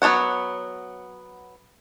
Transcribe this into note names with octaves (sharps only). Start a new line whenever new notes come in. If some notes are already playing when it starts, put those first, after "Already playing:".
F#3 B3 D4 C#5 F#5